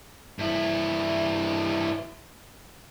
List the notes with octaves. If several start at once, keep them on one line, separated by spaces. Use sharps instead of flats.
G2 E4